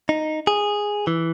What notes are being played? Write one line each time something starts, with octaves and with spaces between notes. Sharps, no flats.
D#4
G#4
E3